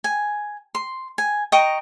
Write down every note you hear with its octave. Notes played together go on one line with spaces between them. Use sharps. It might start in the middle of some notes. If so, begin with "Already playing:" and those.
G#5
C6
G#5
D#5 G5 A#5 C#6